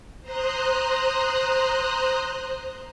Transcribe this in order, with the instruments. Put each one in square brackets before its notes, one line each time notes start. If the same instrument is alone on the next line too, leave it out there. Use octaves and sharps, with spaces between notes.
[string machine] C5 A#5 C6 D#6 F#6